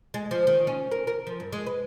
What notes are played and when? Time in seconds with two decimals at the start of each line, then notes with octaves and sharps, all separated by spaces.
0.14 G#3
0.31 F3
0.47 D#3
0.67 C#4
0.91 A#4
1.07 A#4
1.27 F3
1.40 G2
1.52 G#3
1.66 B4